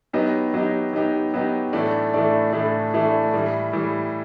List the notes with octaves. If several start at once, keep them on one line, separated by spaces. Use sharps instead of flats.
F#3 B3 D#4 G4
F#3 B3 D#4 G4
F#3 B3 D#4 G4
F#3 B3 D#4 G4
A2 E3 A3 D4
A2 E3 A3 D4
A2 E3 A3 D4
A2 E3 A3 D4
A2 E3 G3
A2 E3 G3